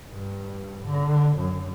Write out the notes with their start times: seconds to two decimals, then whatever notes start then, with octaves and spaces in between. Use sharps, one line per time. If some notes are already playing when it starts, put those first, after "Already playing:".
0.11 G2
0.86 D3
1.37 F#2